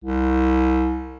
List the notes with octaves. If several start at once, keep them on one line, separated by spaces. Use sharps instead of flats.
C2